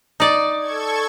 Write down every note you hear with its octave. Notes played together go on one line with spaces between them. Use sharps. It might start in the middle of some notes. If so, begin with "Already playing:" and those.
D#4 D5
A4 C#6 G#6